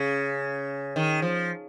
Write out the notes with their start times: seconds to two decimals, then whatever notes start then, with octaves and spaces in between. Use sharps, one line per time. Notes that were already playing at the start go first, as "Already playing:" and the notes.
Already playing: C#3
0.96 D#3
1.22 F3